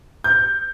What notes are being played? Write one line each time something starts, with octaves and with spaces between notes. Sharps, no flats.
G6